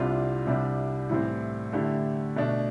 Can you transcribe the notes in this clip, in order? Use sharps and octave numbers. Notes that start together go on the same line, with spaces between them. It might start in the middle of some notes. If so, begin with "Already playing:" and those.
Already playing: C2 C3 G3 D4 F4
C2 C3 G3 D4
A2 E3 G3 C4
D3 A3 E4 G4
B2 A3 D4